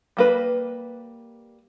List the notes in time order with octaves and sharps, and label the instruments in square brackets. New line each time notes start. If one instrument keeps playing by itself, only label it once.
[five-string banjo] G3 A#3 B4